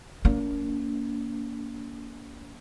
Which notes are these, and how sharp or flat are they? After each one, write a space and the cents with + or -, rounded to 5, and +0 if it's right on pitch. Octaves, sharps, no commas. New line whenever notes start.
A#3 +5 D4 -45